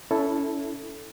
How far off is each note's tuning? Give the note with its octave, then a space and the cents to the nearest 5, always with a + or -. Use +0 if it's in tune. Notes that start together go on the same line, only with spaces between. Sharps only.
C#4 +30 E4 -5 A4 +0